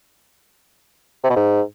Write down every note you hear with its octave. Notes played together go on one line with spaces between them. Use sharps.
C3
B2
G#2